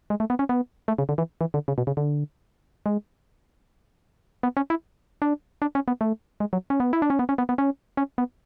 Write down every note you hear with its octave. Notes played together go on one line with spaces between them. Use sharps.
G#3
A3
B3
C#4
B3
A3
C#3
D3
E3
E3
D3
C#3
B2
C#3
D3
G#3
B3
C#4
E4
D4
D4
C#4
B3
A3
G#3
F#3
C#4
B3
E4
D4
C#4
B3
C#4
B3
B3
C#4
C#4
B3